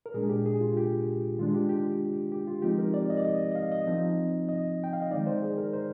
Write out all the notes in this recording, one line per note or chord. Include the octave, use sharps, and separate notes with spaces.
A#4
A#2 G#3 D4 G#4
G4
G#4
F4
G4
D#3 G#3 D4 F4
G4
G4
G4
F4
F3 G#3 C4 D#4 G4
A#4
D5
D#5
D5
D#5
D#5
F5
D#5
F3 C4 D#4
D#5
G5
F5
D#5
D#3 G#3 D#4 D5
C5
G#4
A#4
C5